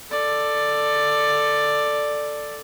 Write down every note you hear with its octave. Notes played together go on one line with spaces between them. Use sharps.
A4 D5